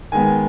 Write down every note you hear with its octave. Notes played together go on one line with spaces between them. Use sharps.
D#3 G#3 B3 G#5